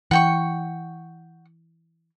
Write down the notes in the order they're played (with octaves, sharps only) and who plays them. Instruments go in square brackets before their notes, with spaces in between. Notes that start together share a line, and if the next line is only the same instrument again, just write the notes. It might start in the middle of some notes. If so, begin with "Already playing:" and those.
[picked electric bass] E3 [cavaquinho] F#5 G5 C#6